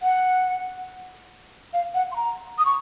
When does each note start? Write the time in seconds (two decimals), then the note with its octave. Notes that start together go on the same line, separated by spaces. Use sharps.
0.02 F#5
1.73 F5
1.94 F#5
2.12 C6
2.16 A#5
2.58 D#6
2.65 C#6